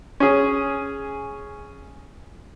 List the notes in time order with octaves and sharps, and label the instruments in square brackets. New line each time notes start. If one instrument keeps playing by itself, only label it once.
[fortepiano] C#4 G#4